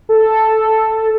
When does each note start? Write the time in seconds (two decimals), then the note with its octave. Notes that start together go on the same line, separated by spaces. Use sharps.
0.09 A4